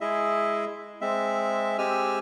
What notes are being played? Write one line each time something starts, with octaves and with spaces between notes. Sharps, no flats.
G#3 E4 G#4 D#5 E5
G#3 C4 E5
G#3 C4 G4 G#5 E6 F6